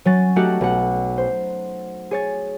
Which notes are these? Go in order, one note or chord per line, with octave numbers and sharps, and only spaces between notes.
F#3 C#4 A6
A3 D#4 F#4 G4 F#5 A5
B1 F#5
C5
G#4 C#5 A6